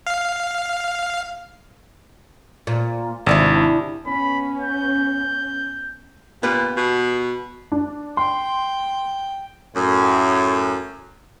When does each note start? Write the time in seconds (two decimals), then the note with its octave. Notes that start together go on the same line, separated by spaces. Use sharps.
0.07 F5
2.67 A#2
3.26 G#1 C3 D4 E4
4.07 B3 C#4 B5
4.60 G6
6.43 A#2 B3 G4 B4
6.77 B2
7.72 D4
8.17 G5 C6
9.75 F#2 A2